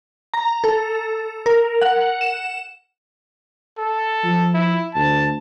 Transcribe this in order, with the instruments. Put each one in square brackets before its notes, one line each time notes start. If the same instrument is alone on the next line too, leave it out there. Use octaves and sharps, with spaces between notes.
[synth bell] A#5
A4
A#4
F#5
E7
[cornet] A4
[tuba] F3
[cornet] E4
[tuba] D2 [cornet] A5